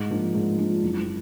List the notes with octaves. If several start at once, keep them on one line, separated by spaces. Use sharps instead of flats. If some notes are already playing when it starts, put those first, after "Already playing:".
Already playing: G#2
F3 A#3 D4 F4
G#2
F3 A#3 D4 F4
F#1